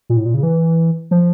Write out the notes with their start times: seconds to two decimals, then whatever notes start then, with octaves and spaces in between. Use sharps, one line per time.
0.09 A#2
0.17 A2
0.26 A#2
0.34 C#3
0.43 E3
1.11 F3